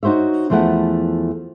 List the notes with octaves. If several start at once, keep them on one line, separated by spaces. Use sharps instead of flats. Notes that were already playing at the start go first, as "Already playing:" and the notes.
D#4 F#4 C5 C#5 E5
E2 F3 A3 E4 F#5